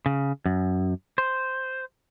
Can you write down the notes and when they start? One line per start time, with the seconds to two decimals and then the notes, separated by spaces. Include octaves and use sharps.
0.06 C#3
0.46 F#2
1.18 C5